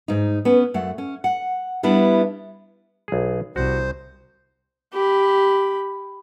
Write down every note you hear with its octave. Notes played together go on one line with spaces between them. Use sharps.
G#2 D#4
B3 C#4
F#2 A3 F#5
C#4
F#5
G3 B3 D4 E4
B1 G#4
C2 F#4 C5
G4 B5